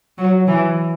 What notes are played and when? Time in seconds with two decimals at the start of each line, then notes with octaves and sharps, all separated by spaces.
0.18 F#3
0.48 E3